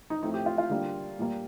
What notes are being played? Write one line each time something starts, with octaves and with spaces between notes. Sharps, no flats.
D#4
A2 F3 A3 C4 D#4
G4
F4
F4
D3 G3 A#3
A#2 G3 A#3